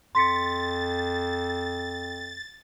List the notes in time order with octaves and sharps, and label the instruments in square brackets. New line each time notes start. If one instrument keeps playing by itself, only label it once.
[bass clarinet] F2 [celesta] C6 B6 C#7 [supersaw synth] A6